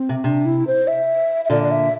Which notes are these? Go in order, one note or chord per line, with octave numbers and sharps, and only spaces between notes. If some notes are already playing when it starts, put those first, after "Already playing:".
Already playing: C4
C3
C3 D4
E4
C5
E5
E5
A#2 D3 D5
D5
E5